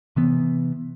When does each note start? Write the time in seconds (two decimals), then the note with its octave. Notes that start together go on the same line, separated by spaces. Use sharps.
0.16 C3 E3 B3